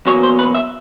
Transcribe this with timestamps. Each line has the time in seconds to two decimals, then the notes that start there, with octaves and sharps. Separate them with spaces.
0.06 E2 B2 F#3 A#3 C#4 C#5
0.23 C5
0.39 B4
0.55 E5